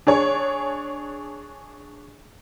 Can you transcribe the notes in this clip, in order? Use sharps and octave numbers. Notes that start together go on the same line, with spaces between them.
D4 G#4 C#5